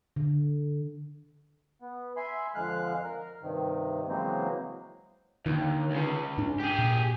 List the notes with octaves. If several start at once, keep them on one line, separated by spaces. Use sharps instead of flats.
D3
B3
E5 G#5 B5 C6
F2 D3 G#3 F5 F#6
A#4
G2 C3 D#3
C#3 E3 F#3 G#3 A#3 C4
D#2 D3 D#3
C#2 C#3
G#2 D4
G4 G#4
A#2